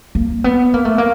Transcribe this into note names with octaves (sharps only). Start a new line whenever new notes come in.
A#3
B3
A#3
A3
A#3